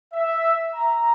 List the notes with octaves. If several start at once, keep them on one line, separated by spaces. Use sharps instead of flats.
E5
A#5